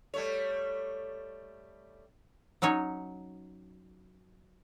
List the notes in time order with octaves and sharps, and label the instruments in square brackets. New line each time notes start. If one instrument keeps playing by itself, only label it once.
[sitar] G3 A3 C#5
[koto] F#3 C#4 D#4 C#5